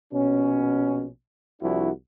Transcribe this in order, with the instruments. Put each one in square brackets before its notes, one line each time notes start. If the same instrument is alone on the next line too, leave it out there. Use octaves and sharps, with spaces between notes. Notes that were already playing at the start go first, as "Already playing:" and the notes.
[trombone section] A#1 B2 C#4
C2 F3 D4 E4 F#4